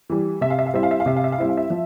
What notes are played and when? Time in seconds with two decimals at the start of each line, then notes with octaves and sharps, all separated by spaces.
0.10 E3 G3
0.41 C3 E5
0.50 F5
0.59 E5
0.66 F5
0.74 G3 C4 E4 E5
0.83 F5
0.91 E5
1.00 F5
1.06 C3 E5
1.17 F5
1.24 E5
1.32 F5
1.38 G3 C4 E4 E5
1.49 F5
1.57 E5
1.70 F3